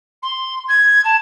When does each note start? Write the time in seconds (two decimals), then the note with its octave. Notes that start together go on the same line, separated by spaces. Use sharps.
0.22 C6
0.68 G#6
1.04 A5